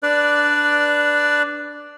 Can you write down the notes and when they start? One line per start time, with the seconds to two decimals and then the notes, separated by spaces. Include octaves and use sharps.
0.03 D4 B4 D5